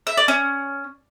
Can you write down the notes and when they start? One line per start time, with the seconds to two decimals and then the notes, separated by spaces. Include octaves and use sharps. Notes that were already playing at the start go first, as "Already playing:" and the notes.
0.07 E5
0.17 D5
0.28 C#4